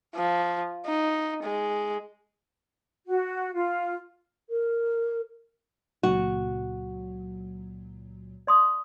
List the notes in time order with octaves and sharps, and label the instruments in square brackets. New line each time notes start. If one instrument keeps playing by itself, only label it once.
[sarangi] F3
D#4
G#3
[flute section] F#4
F4
[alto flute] A#4
[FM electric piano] C#2 A#2 F#3 [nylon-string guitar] F#4
[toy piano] D5 C6 D#6